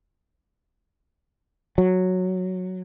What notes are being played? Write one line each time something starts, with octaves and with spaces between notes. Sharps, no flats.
F#3